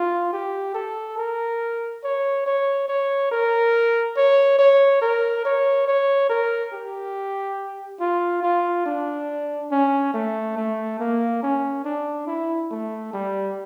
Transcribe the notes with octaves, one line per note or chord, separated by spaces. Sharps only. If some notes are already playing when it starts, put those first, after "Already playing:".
Already playing: F4
G4
A4
A#4
C#5
C#5
C#5
A#4
C#5
C#5
A#4
C#5
C#5
A#4
G4
F4
F4
D4
C#4
A3
A3
A#3
C#4
D4
E4
A3
G3